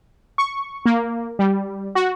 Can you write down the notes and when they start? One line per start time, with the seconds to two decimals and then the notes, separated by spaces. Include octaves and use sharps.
0.38 C#6
0.86 A#3
1.39 G3
1.95 F#4